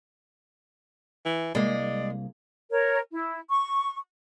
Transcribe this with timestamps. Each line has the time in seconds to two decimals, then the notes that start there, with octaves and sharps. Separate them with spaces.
1.26 E3
1.55 C2 G#3 A#3 D5
2.70 A#4 C#5
3.11 E4
3.49 C#6